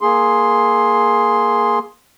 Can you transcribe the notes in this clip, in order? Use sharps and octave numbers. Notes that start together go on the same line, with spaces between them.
A#3 G#4 C6